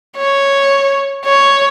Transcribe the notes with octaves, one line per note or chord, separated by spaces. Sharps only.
C#5
C#5